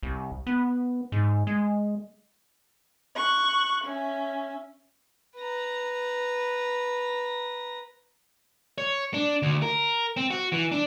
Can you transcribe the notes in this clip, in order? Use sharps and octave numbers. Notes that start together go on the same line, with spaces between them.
C2
B3
G#2
G#3
C#6 F#6
C#4 E5
B4 A#5
C#5
D4
D2
A#4
C4
F#4
E3
D4